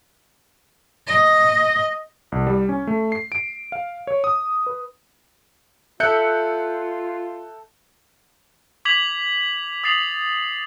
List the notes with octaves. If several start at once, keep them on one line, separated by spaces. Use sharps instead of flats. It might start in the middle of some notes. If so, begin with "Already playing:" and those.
D#5
C2
G3
C#4
A3
C7
D7
F5
C#5
D#6
B4
F4 A4 E5 F#6 G6 C#7
D6 G#6 B6 F7 F#7
D#6 A6 C7 F7 F#7